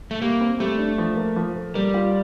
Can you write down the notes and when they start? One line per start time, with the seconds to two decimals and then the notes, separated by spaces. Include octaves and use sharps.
0.11 A3
0.21 G3 A#3
0.40 C4
0.60 G3 A3
0.78 D4
0.98 F3
1.17 A#3
1.36 F3
1.56 A3
1.74 G3 A#3
1.94 F4